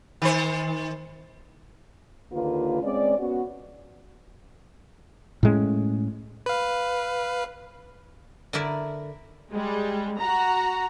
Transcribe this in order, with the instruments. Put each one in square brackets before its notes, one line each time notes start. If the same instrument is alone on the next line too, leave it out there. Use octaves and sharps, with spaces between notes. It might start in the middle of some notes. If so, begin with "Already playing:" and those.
[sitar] D#3 C5
[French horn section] D#2 D3 A#3 F4 B4
G#3 C4 C#4 D5
B3 C#4 F#4
[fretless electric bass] A2 G#3 C#4
[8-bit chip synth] B4 F5
[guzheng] D3 E4 A#4 D5 E5
[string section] G3 G#3
F#4 A#5